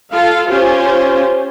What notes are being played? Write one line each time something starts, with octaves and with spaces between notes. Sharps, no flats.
F4 A4 F5
C#4 F4 G4 C5